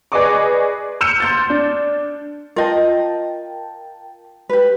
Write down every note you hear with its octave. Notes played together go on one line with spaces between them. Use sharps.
G#4 B4 D5 D#5 C#6 D6
E6 F6 G6 C#7 D7 E7
C6 G6 A6
D4
F4 A#4 D#5 G5 A5
G4 B4